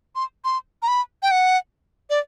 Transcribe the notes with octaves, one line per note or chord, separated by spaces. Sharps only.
C6
C6
A#5
B5
G5
F#5
D5